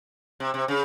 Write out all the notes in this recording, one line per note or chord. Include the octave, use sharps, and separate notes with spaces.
C3
C3
C#3